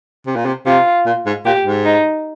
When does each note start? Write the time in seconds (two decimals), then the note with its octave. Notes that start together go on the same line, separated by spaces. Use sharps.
0.26 C3
0.36 A#2
0.45 C3
0.66 C3 F4
1.06 A#2
1.26 G#2
1.45 A#2 G4
1.65 G#2
1.85 D#4